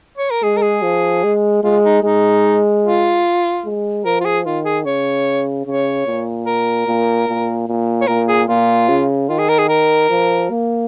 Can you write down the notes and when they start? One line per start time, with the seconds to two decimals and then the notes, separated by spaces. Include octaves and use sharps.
0.18 C#5
0.31 A#4
0.43 G#3 G#4
0.57 A#4
0.62 G#4
0.82 F3
1.24 G#3
1.64 G#3 F4
1.84 D#4
2.03 G#3 D#4
2.84 F4
3.65 G#3
4.05 F3 A#4
4.21 F4
4.25 G#4
4.46 D#3 F4
4.65 G#4
4.85 C#3 C#5
5.66 C#3 C#5
6.06 A#2
6.46 A#4
6.87 A#2
7.28 A#2
7.68 A#2
8.01 C#5
8.07 A#2 A#4
8.28 G#4
8.48 A#2 F4
8.89 C#3
9.29 D#3 F4
9.39 G#4
9.49 A#4
9.59 G#4
9.69 A#4
10.09 F3
10.50 A#3